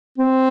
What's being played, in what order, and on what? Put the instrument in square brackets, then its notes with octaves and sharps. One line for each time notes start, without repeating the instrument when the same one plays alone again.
[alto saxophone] C4